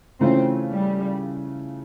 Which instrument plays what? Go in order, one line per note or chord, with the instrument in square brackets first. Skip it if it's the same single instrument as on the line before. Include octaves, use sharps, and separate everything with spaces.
[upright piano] C#3 E3 A3 C#4 F4 [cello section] C4
[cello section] G3